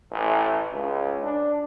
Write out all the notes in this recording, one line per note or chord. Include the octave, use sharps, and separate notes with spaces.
A1
C#2
D4